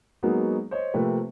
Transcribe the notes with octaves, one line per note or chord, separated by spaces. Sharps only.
F#3 G#3 A#3 B3 D#4 F#4
C5 C#5 D#5
C3 F3 A3 A#3 C4 B4